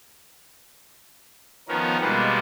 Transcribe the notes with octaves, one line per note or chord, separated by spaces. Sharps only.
D#3 F3 B3 C#4 A#4
B2 G3 G#3 A#3 B3